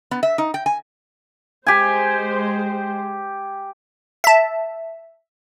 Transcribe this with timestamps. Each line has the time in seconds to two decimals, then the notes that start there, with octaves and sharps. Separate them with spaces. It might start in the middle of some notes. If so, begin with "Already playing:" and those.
0.11 B3
0.23 E5
0.38 D#4
0.54 G5
0.66 G#5
1.67 G#3 G4 C5 G#5
4.24 E5 A5